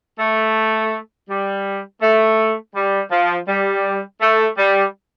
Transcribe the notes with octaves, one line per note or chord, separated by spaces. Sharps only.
A3
G3
A3
G3
F3
G3
A3
G3